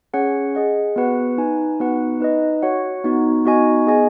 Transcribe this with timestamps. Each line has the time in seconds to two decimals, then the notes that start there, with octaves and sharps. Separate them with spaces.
0.13 C#4 G#4 C#5 F#5
0.55 G#4 D#5 F#5
0.96 B3 F#4 B4 F#5
1.38 D#4 B4 G#5
1.80 B3 D#4 F#4 B4 F#5
2.20 D#4 B4 D#5
2.62 F#4 C#5 F#5
3.04 B3 D#4 F#4
3.45 B3 D#4 F#4 D#5 G#5
3.87 B3 G#4 D#5 G#5